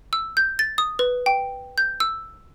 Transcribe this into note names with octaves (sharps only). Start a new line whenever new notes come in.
E6
G6
A6
D#6
B4
G5
G6
E6